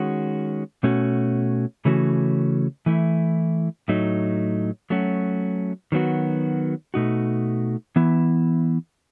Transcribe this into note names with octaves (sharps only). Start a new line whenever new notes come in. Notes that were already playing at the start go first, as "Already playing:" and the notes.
Already playing: D#3 G#3 C#4 F#4
B2 A3 C#4 F#4
C#3 E3 A3 C#4 F#4
E3 A3 E4
A2 F#3 A3 D#4
F#3 A3 C#4 F#4
D#3 F#3 B3 F#4
B2 A3 D#4 F#4
E3 B3 E4